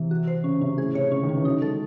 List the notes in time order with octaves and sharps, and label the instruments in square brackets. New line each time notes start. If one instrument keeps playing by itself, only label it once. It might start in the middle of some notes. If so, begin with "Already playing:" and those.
Already playing: [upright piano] C3 [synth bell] E3
[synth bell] F#4
C5
[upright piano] C#3 [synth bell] C#4
[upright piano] C3 [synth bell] C#4
[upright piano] A2 [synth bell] G#4
[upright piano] C3 [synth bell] C#5
[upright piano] C#3 [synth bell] C#4
[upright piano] D#3
[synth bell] C#4
[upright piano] E3
[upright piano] F#3 [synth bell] D#4
[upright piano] G#3 [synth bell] A4